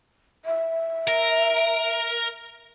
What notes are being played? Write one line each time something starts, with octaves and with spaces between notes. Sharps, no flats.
E5
A#4